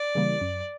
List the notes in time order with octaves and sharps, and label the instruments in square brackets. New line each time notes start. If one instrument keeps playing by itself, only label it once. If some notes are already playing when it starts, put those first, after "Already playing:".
Already playing: [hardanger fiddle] D5
[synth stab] C#3 E3 G3 A#3
F#2